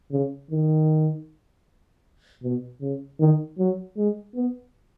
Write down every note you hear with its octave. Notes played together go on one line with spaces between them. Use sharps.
C#3
D#3
B2
C#3
D#3
F#3
G#3
B3